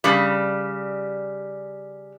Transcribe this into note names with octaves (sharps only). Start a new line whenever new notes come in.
C#3 G3